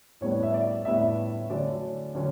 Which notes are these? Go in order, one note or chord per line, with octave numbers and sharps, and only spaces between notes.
A2 G3 B3 D4 C#5
E5
D5
A2 G3 B3 D4 E5
D3 F#3 C#4 D5
D3 F#3 C#4